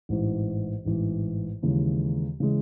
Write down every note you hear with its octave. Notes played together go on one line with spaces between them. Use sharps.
A1 G#2 E3
A1 G#2 E3
D#2 C#3 E3 G#3
C#3 E3 G#3